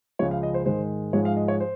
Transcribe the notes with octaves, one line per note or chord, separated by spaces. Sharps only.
C#2 C#3 F3 G#3 C#5
F5
D#5
C5
G#2 D#3 G#3 C5
G#2 F3 G#3 C#5
F5
D#5
C#5
C5